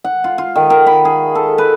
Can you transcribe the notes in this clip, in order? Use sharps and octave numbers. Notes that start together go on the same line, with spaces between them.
F#5
F4
F4
D#3
A#4
B5
G#4
A4
B4